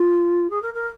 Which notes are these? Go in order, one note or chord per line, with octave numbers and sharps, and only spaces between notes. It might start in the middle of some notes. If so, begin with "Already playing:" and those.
Already playing: F4
G#4
A#4
A#4